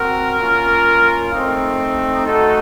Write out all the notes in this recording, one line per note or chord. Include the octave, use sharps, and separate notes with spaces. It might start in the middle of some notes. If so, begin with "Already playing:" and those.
Already playing: C4 F#4 A#4
A#3 C#4 F4
A3 C4 D#4
A3 D#4 F#4 A4